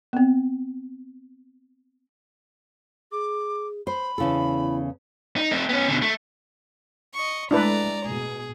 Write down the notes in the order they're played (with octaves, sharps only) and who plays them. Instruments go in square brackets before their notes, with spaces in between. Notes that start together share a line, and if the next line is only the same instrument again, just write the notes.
[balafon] B3 C4
[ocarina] G#4 [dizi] D6
[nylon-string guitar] C5 [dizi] B5
[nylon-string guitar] E2 C#3 A4 [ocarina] E4
[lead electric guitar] D#4
A3 C4
B3 C#4
B2 D3
A3
[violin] D#5 C#6
[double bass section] G#3 A3 [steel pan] D4 E4 B4 [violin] D5 A#5
[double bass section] B2 [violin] G#4